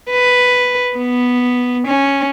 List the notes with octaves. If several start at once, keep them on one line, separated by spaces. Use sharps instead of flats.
B4
B3
C#4